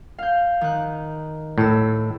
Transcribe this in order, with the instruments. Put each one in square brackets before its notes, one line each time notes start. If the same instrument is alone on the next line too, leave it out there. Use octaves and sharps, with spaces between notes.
[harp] F5 G6
D#3 F#6
[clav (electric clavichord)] A2 [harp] E4 E6